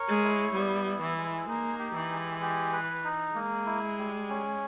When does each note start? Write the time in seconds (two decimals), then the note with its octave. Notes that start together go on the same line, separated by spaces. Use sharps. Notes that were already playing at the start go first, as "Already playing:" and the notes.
Already playing: A#4 C#5
0.08 G#3
0.24 E4
0.54 G3 B3
0.86 E4
1.02 E3
1.17 G#3
1.48 A#3 D#4
1.79 G4
1.95 E3
2.11 G#3
2.42 G4
2.73 B4
3.05 D#4
3.35 G#3 A#3
3.66 E4
3.98 G3
4.29 C#4